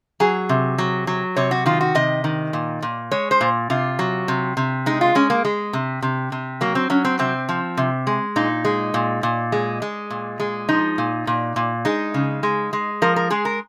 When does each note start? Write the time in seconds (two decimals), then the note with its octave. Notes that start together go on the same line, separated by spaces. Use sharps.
0.20 F#3 G#4
0.49 C3
0.78 F#3
1.07 F#3
1.36 C3 C#5
1.51 F#4
1.66 D#3 F4
1.81 F#4
1.95 C3 D#5
2.24 D#3
2.53 A#2
2.82 A#2
3.11 G#3 C#5
3.31 C5
3.41 A#2
3.70 C3 F4
3.99 F#3
4.28 C3
4.57 C3
4.86 G#3 D#4
5.01 F4
5.15 G#3 C#4
5.30 A#3
5.45 G#3
5.73 C3
6.02 C3
6.32 C3
6.61 F#3 A#3
6.75 C4
6.90 F#3 C#4
7.05 C4
7.19 C3 C4
7.49 F3
7.77 C3
8.07 G#3
8.36 A#2 D#4
8.65 G#3
8.94 A#2
9.23 A#2
9.52 G#3
9.82 G#3
10.10 A#2
10.40 G#3
10.69 F3 D#4
10.98 A#2
11.27 A#2
11.56 A#2
11.85 G#3 D#4
12.14 C#3
12.43 G#3
12.73 G#3
13.02 F3 A#4
13.16 A#4
13.30 G#3 G#4
13.45 A#4